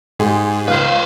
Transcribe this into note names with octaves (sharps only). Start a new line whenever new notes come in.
G#2 G4 G#4 C6
C#2 B4 C5 F5